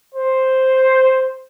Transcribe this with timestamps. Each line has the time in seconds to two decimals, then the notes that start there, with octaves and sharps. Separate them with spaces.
0.14 C5